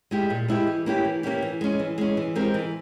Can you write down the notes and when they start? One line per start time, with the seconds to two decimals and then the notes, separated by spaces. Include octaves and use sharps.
0.11 G#3 E4 G4
0.30 A#2
0.48 G#3 E4 G4
0.67 E3
0.86 A#3 C#4 E4 G4
1.05 E3
1.23 A#3 C#4 E4 G4
1.42 E3
1.61 G#3 C#4
1.79 E3
1.98 G#3 C#4
2.17 E3
2.35 G#3 C4 G4 A#4
2.54 E3